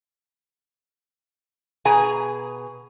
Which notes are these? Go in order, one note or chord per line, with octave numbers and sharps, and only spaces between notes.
B2 G#4 G#5 A#5